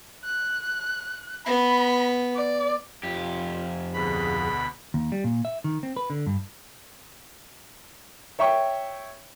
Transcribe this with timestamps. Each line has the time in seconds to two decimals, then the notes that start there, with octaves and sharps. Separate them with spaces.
0.24 F#6
1.46 B3 B5
2.35 D5
3.03 F2 F4 G4
3.93 D2 B2 G#4 B5
4.94 D#2
5.12 G3
5.24 A#2
5.45 E5
5.64 D#3
5.83 C4
5.97 B4
6.10 D3
6.26 G2
8.39 C#5 E5 G5 C#6